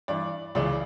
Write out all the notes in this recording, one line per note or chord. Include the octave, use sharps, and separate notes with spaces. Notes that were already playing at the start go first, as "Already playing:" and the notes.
G2 E3 D5
C#2 C#3 E3 D5